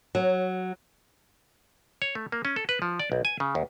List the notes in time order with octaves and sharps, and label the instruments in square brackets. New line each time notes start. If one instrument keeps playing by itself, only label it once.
[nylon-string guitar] F#3
[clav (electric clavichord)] C#5
A3
A#3
C#4
A4
B4
F3
D5
B1
G#5
C#3
D#2